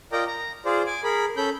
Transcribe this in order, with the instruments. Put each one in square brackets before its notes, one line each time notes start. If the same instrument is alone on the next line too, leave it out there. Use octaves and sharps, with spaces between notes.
[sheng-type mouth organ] F4 A#4 D5 D#5 G5 A#5
A#5
F4 G#4 C5 D5
G#5 D6
G#4 A#4 B5
C#4 A4 B5 G6